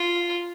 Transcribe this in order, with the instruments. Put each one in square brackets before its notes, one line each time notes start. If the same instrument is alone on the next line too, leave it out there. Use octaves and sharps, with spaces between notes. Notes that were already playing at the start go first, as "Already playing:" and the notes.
Already playing: [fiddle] F4